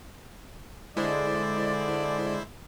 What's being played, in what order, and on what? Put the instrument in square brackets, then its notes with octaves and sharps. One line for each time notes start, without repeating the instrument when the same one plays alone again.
[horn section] D3 D5 [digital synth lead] G#3 [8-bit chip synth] E4 C5